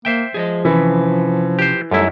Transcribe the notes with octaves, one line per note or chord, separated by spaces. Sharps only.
A#3 C5 E5 G5
F3 G#4 D5 D#5
C3 E3 C#4 B4
G4 C5
F#2 G3 A3 D#4 E4 A4